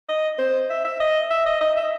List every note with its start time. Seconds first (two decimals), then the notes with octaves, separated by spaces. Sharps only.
0.09 D#5
0.39 C5
0.70 E5
0.85 E5
1.00 D#5
1.30 E5
1.46 D#5
1.61 D#5
1.77 E5